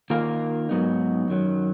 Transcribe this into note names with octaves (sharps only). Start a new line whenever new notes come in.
D#3 A#3 F4 A#4 F5
G#2 F#3 B3 D#4
F#2 D#3 F#3